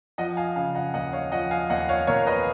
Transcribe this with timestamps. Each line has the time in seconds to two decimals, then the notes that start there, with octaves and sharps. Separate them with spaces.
0.18 F3 D#5 F#5
0.37 F5 G#5
0.56 C#3 F5 G#5
0.75 D#5 F#5
0.94 D#2 D#5 F#5
1.13 C#5 F5
1.32 F3 D#5 F#5
1.51 F5 G#5
1.70 D#2 D#5 F#5
1.89 C#5 F5
2.07 D#2 A#4 C#5
2.27 B4 D#5